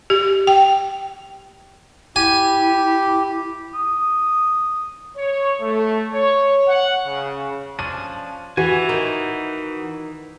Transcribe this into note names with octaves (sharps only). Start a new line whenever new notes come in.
G4
G5
E4 G4 G#5
D#6
C#5
A3
C#5
F#5
C#3
F3 C#4 D4 D#7
E3 F#4 G#5
D#3 D#4